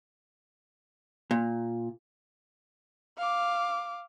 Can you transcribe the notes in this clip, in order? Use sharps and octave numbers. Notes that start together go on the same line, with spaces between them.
A#2
F5 D6